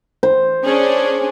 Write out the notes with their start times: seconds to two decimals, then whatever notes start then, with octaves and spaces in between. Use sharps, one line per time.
0.23 C5
0.66 C#4 D4 G#4